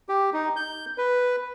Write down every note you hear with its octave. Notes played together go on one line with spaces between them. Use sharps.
G4
D#4
G6
B4